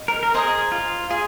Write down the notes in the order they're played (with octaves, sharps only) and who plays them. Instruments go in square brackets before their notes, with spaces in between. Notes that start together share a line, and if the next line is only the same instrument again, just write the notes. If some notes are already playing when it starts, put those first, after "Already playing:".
Already playing: [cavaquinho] D#5
[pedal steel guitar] A#4
A#4
[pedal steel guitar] G#4 [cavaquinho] C5 D#5 A#5 D#6
[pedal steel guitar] F4
[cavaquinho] F4 [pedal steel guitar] G#4